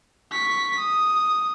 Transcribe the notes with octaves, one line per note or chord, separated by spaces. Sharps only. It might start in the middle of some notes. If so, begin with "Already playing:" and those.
C#6 B6
D#6